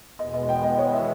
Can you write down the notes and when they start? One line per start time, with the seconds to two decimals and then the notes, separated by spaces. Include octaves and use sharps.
0.19 E2 B2 G#3 B3 D#5
0.34 D#5
0.49 G5
0.64 D#5
0.79 C#5
0.93 E5